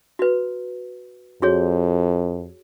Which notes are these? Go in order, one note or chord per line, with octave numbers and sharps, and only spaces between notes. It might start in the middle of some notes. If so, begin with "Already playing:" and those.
F#4 B4
F2 F#4 G#4 C#5